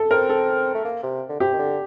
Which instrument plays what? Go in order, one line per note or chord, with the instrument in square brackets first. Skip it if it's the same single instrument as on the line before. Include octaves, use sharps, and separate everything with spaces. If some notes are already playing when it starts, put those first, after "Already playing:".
Already playing: [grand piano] A4
[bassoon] C4 [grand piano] A#4
[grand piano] A4
[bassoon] A3
A#3
C3
D3
[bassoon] C3 [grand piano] G4
[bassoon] D#3
D3